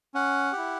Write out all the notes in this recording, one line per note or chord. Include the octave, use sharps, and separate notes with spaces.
C#4 F#5
E4 G4